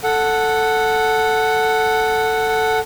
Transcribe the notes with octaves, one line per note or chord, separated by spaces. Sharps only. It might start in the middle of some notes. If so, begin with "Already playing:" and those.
A4 F#5